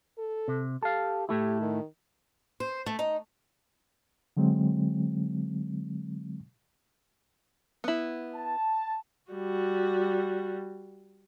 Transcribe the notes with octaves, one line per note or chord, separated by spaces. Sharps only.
A4
C3
G4 A4 F5
A2 A3 E4 G4
D#3
C5
A3
D#4
D3 F#3 G#3 C4
B3 E4
A5
G3 F#4